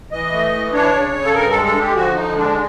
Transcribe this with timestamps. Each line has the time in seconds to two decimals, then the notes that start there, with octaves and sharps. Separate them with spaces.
0.12 E3 D#5
0.32 A3
0.53 E3
0.73 D4 C#5
0.94 C#3
1.14 C#3
1.25 A4
1.34 G2 A#4
1.50 G#3 A4
1.65 A4
1.76 D3 G4
1.95 F3 F#4
2.15 D3 D#4
2.36 G#3 D4